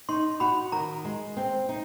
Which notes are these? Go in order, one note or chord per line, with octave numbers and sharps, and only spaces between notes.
D#4 C6
F#4 B5
D#3 A#5
G#3
C4
D#4